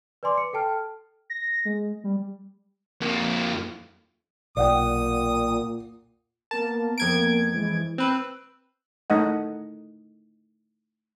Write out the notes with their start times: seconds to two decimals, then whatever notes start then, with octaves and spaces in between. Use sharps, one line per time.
0.23 B4 D5 G#5 C6 D6
0.37 C#7
0.53 A4 G5 A5 F6
1.30 A#6
1.65 G#3
2.04 G3
3.01 F2 A#3
4.57 B1 A#2 D5 F#5 G5 D#6
6.51 A#3 B3 A#4 A5
6.98 F2 G#6 D7
7.53 E3 G#3
7.98 C4 B4 E6 F#6
9.10 A3 D#4 D#5 F#5